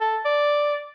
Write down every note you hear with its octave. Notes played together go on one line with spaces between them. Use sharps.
A4
D5